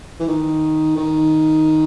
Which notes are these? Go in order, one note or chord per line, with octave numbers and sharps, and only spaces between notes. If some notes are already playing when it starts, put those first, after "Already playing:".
E3
D#3
D#3